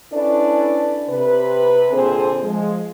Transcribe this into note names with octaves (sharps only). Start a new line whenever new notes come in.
C#4 D4 E4 A4 B4 D5
C3 B4
A#2 D3 C4 G#4 C5
F3 G#3